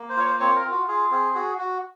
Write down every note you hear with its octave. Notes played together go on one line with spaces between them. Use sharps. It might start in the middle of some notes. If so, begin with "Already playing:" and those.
Already playing: A#3
C5
F4 C#5
C5
C4 C#5
A#4
F4
F#4
F4 G#4
C4 G#4
F#4 G#4
F#4